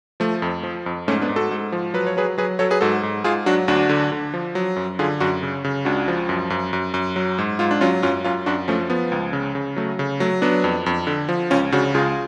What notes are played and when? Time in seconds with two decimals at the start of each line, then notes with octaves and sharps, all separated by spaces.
0.20 F3 A3
0.42 F2
0.63 F3
0.86 F2
1.08 G#2 A3 C#4
1.22 B3 D4
1.29 G#2
1.36 F#4 A4
1.51 G#2
1.72 F3
1.94 F#3 B4
2.07 C#5
2.17 F#3 G#4 B4
2.38 F#3 G#4 B4
2.59 F#3 A4 C#5
2.71 G#4 B4
2.81 G#2 F#4 A4
3.03 G#2
3.24 G#2 F4 G#4
3.46 F#3 D4 F#4
3.68 D2 D4 F#4
3.89 D3
4.12 D3
4.34 F3
4.55 F#3
4.76 F#2
4.99 D3 F4 G#4
5.20 F#2 D4 F#4
5.43 C#3
5.64 C#3
5.85 C#2 D4 F#4
6.08 F3
6.29 F#2
6.50 F#2
6.73 F#2
6.94 F#2
7.16 F#3
7.38 G#2
7.59 G#2 F4
7.71 D4
7.81 F#3 C#4 F4
8.02 F#2 C#4 F4
8.24 F#2 C#4 F4
8.46 F#2 D4 F#4
8.68 F3 A3 C#4
8.90 F3 B3
9.12 C#2
9.33 C#3
9.55 C#3
9.76 F#3 A3
9.99 C#3
10.20 F#3 A3
10.42 F#3 B3 D4
10.64 F2
10.86 F2
11.07 D3
11.29 F3
11.50 C#2 C#4 F4
11.72 C#3 D4 F#4
11.94 C#2 F4 G#4